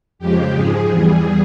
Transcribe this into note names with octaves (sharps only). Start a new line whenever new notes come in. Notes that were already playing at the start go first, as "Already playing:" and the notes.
F2 C#3 F3 G#3 G4
G#2 F3 G#3 G#4
E2 E3 G3